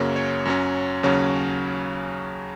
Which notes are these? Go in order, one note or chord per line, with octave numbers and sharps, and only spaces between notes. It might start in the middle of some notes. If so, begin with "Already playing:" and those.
Already playing: F#2 C#3 F#3 A#3 C#4
C#5
F#2 F#3 C#4
D#2 C#3 F#3 C#4